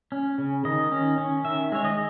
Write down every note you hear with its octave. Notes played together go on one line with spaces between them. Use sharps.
C#4
C#3
D#3 D#5
C#4
C#4
D#3 E5
G#3 C#5
D#5